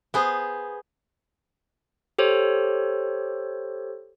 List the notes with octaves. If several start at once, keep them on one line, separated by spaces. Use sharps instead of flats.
B3 G#4 C5
G4 A4 C5 C#5